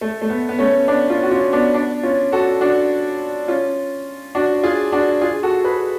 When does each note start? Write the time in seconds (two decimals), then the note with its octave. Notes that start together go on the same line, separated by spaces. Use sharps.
0.01 A3
0.22 A3
0.30 B3
0.49 B3
0.59 A3 C#4
0.88 B3 D4
1.09 C#4 F4
1.23 F#4
1.31 C#4 F4
1.53 B3 D4
1.74 B3 D4
2.03 C#4 F4
2.32 F#4 A4
2.61 D4 F#4
3.48 C#4 F4
4.35 D4 F#4
4.63 F4 G#4
4.92 D4 F#4
5.21 F4 G#4
5.43 F#4 A4
5.65 G#4 B4